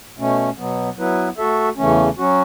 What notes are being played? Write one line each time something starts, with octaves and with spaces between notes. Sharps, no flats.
B2 A3 C#4
B2 F#3 B3
F#3 B3 E4 B4
A3 F#4 A4 E5
E2 C#3 E3 A3 C#4
F#3 C#4 F#4